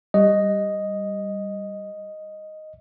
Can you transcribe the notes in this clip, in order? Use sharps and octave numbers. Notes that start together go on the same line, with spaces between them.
G3 D#5